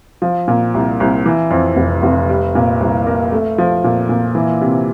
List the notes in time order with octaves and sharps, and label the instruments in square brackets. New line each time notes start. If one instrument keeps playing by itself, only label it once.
[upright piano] F3
A#2
C2
C2
E3
F2
F1
F1
G3
A#2
C2
A#3
A3
F3
A#2
A#2
E3
C3